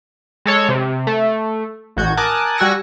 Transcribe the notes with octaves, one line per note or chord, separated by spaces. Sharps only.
G#3 A4 C#5
C3
A3
A1 F#4 G6 G#6
A#4 G#5 A5 D6 D#6 F#6
G3 F#4 G#5 E6 A#6 C#7